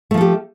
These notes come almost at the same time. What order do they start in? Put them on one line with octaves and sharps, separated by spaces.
A3 F3 A4 G4